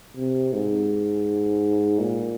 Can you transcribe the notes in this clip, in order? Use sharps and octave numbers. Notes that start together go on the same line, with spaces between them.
C3
G#2
A#2